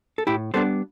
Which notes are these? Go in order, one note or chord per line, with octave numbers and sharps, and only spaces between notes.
A4
A2 E4 G4
G3 B3 D4 A4 C5